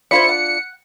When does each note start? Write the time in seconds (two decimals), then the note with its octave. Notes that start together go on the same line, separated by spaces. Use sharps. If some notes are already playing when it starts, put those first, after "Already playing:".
0.11 D4 E4 F4 C5 B5 C#7
0.29 F#5